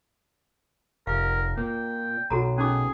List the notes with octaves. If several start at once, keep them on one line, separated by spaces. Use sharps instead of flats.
F1 A#4 F5
A#2 G5
B1 F#4 A4 A#5
C#4 D#4 G#4 D6